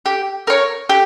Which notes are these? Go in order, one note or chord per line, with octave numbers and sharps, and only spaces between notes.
G4
A#4 C#5
G4